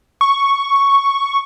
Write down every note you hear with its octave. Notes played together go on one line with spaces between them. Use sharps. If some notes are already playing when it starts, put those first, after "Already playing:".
C#6